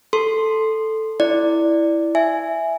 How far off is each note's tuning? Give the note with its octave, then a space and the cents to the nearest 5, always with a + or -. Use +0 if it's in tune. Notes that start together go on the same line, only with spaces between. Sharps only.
A4 +0 C6 +0
E4 +0 D5 +0
E5 +0 G#5 +0